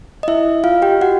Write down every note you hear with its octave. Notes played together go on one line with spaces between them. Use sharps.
D#5
E4 E5
F4 F5
G4 G5
F#4 F#5